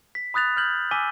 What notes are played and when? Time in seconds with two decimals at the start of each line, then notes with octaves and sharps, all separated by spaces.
0.15 B6
0.34 B5 D#6 F#6 A6 F7
0.57 F6 G6 F#7
0.91 G#5 D6 E6 B6 D#7 G7